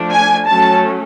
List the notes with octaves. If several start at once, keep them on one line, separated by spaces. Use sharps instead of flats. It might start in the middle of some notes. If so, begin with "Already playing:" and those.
Already playing: F3 A3 D4
G#5
F#3 A3 C#4 A5